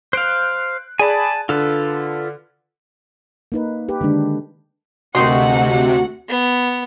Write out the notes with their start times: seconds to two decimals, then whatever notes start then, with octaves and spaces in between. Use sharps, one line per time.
0.13 C5 F5 F#6 G6 D7
0.99 G#4 D5 G#5 A5 B5
1.49 D3 F4 A4 B4
3.52 A#3 D#4 B4
3.89 G4 B4
4.01 D3 D#3 G#3 D4
5.15 D2 C3 D#3 D#4 F#4 F#5 C6
6.29 B3